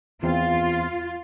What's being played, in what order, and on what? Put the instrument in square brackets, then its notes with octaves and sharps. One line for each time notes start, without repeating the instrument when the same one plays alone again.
[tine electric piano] E2 C4 [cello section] F4